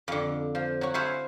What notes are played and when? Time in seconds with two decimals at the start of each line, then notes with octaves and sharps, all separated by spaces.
0.08 F2 D3
0.55 F3
0.81 F#3 F#4
0.94 E4 F#4 C5 E5 F5 G#5